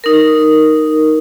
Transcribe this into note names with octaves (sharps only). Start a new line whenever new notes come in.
D#4 A#4